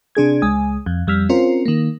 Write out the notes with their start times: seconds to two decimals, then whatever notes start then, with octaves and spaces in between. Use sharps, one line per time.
0.15 C3 D4 G#4 G#6
0.42 C#2 G#3 G#5 D#6
0.86 F2
1.07 F2 G3 E6 F6 B6
1.29 C4 C#4 F4 A#4 C5
1.66 D#3 A#3